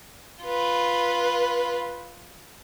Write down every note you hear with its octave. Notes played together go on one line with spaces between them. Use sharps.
F4 B4